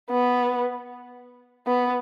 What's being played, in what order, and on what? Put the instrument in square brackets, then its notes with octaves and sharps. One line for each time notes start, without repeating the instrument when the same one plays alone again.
[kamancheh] B3
B3